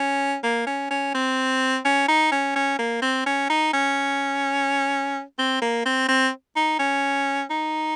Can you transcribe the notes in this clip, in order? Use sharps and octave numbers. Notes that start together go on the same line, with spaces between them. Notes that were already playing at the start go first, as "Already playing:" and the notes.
Already playing: C#4
A#3
C#4
C#4
C4
C#4
D#4
C#4
C#4
A#3
C4
C#4
D#4
C#4
C4
A#3
C4
C4
D#4
C#4
D#4